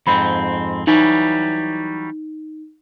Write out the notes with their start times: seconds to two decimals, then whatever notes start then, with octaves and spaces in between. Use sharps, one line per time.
0.07 F2 G#2 C4 B5
0.87 E3 F#3 G3 D#4